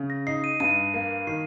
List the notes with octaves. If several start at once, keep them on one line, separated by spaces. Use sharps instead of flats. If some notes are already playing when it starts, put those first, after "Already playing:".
Already playing: C#3
A#6
D#4 C7
D#7
G2 D#7
A#3
D#3 C7